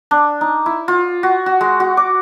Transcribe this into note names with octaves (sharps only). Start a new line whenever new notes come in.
D4
D#4
E4
F4
F#4
F#4
G#3
F#4
D6